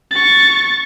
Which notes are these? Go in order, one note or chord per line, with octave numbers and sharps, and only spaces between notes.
C#6 A6